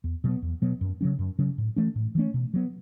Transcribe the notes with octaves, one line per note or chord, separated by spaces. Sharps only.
E2
B2 F#3 B3
E2
B2 F#3 B3
F#2
C#3 F#3 C#4
F#2
C#3 F#3 C#4
A2
E3 A3 C#4
A2
E3 A3 C#4
B2
F#3 B3